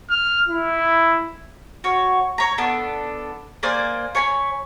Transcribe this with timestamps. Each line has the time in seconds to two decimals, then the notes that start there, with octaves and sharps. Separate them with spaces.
0.10 F6
0.48 E4
1.84 F#4 C#5
2.38 C#5 A#5
2.58 B3 D4 A4
3.63 A#3 C5 D5 G#5
4.15 C#5 G#5 A#5 B5